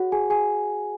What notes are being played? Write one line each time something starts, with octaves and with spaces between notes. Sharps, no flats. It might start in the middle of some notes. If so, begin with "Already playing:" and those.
Already playing: F#4 G#4 C#5 F#5
G#4 G#5
G#4 G#5